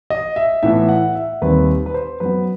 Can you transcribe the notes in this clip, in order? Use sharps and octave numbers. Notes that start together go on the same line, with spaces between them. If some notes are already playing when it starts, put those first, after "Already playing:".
D#5
E5
A2 E3 B3 E5
F#5
E5
D#2 D#3 G3 C4 B4
B4
C5
F#2 F#3 B3 B4